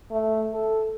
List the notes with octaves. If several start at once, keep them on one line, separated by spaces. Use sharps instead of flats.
A3
A4